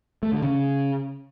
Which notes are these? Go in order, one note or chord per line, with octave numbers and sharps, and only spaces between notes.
A3
D3
C#3